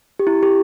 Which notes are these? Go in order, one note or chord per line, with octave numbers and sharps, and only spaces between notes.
G4
E4
G4